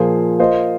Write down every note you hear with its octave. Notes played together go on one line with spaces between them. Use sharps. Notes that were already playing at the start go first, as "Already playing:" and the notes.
Already playing: A#2 F3 A#3 G#4 C5
A#3 F4 C5 D#5